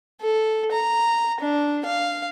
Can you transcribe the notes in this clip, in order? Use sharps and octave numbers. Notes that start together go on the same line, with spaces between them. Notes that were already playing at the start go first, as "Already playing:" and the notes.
A4
A#5
D4
F5